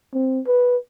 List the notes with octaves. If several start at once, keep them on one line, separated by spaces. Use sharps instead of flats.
C4
B4